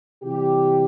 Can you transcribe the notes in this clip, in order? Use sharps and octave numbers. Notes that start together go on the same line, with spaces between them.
C3 E3 G3 G4